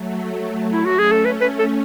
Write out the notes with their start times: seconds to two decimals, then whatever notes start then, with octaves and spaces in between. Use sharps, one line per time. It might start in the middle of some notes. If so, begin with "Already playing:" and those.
Already playing: F#3 A3
0.73 E4
0.85 F#4
0.91 A3 C#4
0.99 G#4
1.12 A4
1.25 B4
1.41 B4
1.59 A4